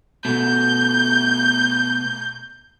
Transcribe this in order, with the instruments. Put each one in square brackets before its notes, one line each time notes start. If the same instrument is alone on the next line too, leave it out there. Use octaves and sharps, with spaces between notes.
[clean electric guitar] B2 A3 [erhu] G6